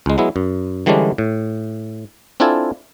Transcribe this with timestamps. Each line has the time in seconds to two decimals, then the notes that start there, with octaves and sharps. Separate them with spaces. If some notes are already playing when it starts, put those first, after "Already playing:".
0.06 C#2 G#3
0.18 F#3 G#3 B3 E4
0.36 F#2
0.86 D3 E3 G3 G#3 C#4 D4
1.18 A2
2.40 C4 D4 E4 F4 A4 G#5